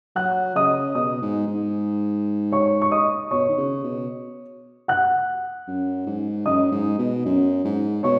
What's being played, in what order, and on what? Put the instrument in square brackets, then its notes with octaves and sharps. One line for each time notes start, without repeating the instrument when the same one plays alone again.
[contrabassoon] F#3 [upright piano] F#5 F#6
[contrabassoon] C#3 [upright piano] D#5 D#6
[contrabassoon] B2 [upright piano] D#5 D#6
[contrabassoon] G#2
G#2
[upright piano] C#5 C#6
C#6
D#5 D#6
[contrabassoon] B2 [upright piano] C#5 C#6
[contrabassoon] D#3
C#3
B2
[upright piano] F#5 F#6
[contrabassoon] F#2
G#2
[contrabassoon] F#2 [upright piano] D#5 D#6
[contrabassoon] G#2
B2
F#2
G#2
[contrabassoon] B2 [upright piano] C#5 C#6